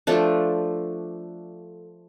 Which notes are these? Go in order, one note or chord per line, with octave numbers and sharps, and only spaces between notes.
F3 A3 D4